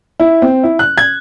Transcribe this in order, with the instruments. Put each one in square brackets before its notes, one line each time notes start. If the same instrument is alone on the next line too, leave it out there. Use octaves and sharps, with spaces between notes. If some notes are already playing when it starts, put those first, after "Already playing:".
[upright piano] E4
C4
E4
F#6
G#6